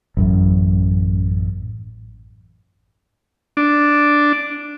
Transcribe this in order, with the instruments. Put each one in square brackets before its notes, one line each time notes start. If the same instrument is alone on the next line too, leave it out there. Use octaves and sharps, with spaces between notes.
[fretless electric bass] A1 F#2
[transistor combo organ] D4